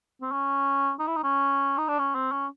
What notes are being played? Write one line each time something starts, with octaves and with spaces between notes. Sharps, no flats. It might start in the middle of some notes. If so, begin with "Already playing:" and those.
C4
C#4
D#4
E4
D#4
C#4
D#4
D4
C#4
C4
C#4